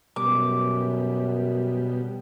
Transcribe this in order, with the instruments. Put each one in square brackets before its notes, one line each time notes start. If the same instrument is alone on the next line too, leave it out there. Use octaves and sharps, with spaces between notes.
[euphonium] F#2 [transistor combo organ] B2 G3 [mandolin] D6